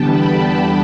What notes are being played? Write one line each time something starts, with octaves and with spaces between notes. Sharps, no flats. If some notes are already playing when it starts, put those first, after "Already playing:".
Already playing: E2 D3 G3 B3 G5 A5
B5